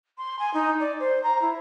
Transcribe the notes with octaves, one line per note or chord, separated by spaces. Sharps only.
C6
G#5
D#4
D5
C5
A#5
E4